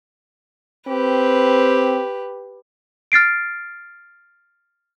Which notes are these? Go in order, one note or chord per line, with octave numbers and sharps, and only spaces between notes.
C4 G4 B4
F6 A6 C7 D7